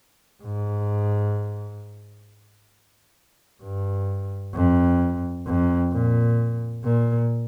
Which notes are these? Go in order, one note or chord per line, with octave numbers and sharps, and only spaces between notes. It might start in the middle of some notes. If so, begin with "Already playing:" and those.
G#2
G2
F2
F2
A#2
A#2